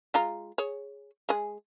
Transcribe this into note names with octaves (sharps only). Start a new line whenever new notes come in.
G#3 F4 A#5
G#4 C#5
G#3 G#4